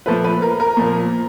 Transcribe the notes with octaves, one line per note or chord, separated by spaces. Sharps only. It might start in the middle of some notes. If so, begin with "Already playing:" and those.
A#2 F3 A3 B4
B4
A#4
A#4
A#2 F3 A#3